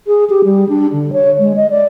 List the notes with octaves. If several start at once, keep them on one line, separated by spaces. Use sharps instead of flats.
G#4
G4
G3
D4
D3
C#5
G#3
D#5
D5